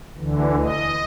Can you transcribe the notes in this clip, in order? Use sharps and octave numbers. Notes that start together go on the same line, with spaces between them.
D2 D3 E3
D#5